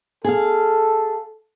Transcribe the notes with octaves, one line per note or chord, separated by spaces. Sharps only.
G#4 A4 F5